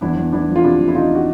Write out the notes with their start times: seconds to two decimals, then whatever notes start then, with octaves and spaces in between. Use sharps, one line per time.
0.01 E2 D4 E4
0.17 E2
0.32 E2 D4 E4
0.49 F3
0.56 F4
0.63 C3 D4 E4
0.80 E2
0.88 E4
0.95 C3 D#4 F4
1.15 F#4